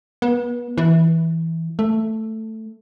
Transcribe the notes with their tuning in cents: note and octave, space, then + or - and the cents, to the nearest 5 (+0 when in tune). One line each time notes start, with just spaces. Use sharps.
B3 -35
E3 -10
A3 +5